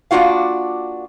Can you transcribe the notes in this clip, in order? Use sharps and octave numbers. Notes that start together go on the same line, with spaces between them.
A#3 D4 F4 F#4 F5